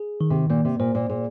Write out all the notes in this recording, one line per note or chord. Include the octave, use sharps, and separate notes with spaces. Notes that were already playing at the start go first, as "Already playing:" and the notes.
Already playing: G#4
D#3
C3
A#2 A#3
C3
A#2 C5
A#2
A#2 G#4